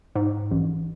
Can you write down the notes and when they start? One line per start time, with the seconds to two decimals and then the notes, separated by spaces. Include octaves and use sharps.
0.15 G#2
0.51 A1